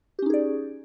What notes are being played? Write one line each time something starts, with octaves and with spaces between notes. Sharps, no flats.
C#4 D#4 G4 G#4 D5